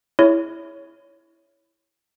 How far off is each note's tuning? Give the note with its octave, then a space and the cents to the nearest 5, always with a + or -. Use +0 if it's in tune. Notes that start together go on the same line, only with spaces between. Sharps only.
E4 +0 G#4 -10 C#5 +10